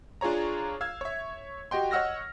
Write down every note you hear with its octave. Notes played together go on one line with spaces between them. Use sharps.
D4 F4 G#4 C#5 A#5
F5 E6 G#6
C#5 E5
F#4 G4 D#5 G5 C6
C#5 D#5 F#5 E6 F6 A#6